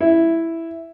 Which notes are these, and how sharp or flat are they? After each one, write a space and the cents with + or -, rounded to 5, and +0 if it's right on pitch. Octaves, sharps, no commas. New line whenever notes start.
E4 +0